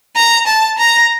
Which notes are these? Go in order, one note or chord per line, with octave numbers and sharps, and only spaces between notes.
A#5
A5
A#5